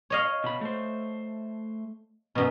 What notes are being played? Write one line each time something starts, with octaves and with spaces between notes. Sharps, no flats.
C#5 D#5 F5
B2 B5
A3 C5
F#2 B2